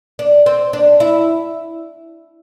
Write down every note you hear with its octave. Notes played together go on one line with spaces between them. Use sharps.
D4
C4
D4
E4